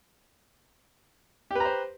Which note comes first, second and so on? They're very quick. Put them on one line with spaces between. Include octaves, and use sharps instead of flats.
G4 B4 A#5 C5